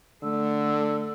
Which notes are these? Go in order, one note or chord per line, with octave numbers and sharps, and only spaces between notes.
D3 A3 E6